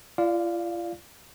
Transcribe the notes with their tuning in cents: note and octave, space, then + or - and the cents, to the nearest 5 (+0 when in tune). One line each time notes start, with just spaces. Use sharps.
F4 -40 D5 +0 F5 +0